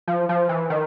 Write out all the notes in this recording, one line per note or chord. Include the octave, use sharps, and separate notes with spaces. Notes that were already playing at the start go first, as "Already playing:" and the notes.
F3
F3
E3
D#3